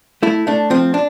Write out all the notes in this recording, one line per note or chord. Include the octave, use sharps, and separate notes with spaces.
A3 E4
A3 D4
F3 C4
D4